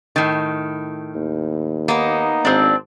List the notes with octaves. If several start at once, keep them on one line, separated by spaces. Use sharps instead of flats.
A2 D#3
D#2
A#3 B3 D#4
G#1 C4 D4